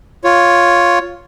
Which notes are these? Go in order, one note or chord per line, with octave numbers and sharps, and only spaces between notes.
F4 C#5